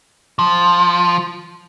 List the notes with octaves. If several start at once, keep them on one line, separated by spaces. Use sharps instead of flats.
F3